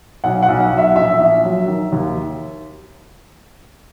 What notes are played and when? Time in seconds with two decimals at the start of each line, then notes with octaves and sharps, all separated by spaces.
0.24 B1 F#5
0.43 F#5
0.49 B1
0.60 F#5
0.72 B1
0.78 E5
0.95 A#1 E5
1.20 A#1
1.45 F#3
1.68 D#3
1.92 D#2